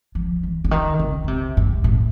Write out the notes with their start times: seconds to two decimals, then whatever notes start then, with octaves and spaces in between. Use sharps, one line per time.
0.15 F3
0.43 E3
0.64 D3
0.71 D#3
0.99 C#3
1.24 C#3
1.28 C3
1.57 G#2
1.84 A2